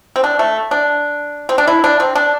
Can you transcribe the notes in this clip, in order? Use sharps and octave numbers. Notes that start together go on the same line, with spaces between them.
C4
D4
A3
D4
C4
D4
E4
D4
C4
D4